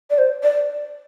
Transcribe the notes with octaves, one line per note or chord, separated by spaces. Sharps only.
D5
C5
D5